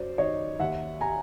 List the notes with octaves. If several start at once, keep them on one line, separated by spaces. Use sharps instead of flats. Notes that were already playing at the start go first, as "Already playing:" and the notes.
Already playing: F#2 C5 D5
D#3 C#5 D#5
D#2 E5 F#5
G#5 A#5